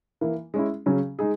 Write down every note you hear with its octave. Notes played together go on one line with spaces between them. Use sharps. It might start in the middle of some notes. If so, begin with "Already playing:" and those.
E3 A#3 E4
G#3 C#4 E4
C#3 F#3 C#4
G#3 D#4 G#4